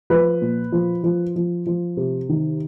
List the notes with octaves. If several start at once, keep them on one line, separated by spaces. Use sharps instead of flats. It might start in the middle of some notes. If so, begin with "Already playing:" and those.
F3 B4
A#2
F3
F3
F3
F3
C3
D#3